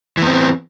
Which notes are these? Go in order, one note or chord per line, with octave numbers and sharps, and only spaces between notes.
E3 B3 C4